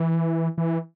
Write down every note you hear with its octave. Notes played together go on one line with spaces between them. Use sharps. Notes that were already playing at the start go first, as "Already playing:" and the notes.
Already playing: E3
E3